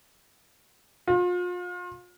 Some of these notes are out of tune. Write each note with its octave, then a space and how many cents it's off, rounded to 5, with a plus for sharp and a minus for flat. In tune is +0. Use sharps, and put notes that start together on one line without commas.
F4 +35